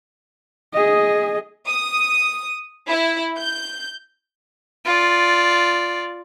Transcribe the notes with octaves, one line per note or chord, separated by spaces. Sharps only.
G#4 D#5
D#6
E4
G6
F4 D5